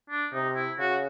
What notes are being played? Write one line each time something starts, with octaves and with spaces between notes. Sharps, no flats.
D4
C3 D#4
E4
C#3 F#4